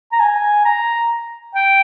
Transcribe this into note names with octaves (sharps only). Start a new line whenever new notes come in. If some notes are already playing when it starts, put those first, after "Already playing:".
A#5
G#5
A#5
G5